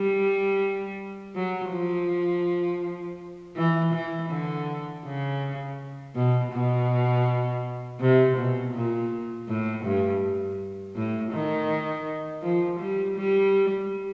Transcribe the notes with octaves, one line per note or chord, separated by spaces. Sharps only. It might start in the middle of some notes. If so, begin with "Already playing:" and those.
Already playing: G3
F#3
F3
E3
E3
D3
C#3
B2
B2
C3
B2
A#2
A2
G2
A2
D#3
F3
G3
G3